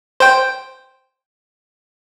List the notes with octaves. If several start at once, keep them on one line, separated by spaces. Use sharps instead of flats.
C5 G5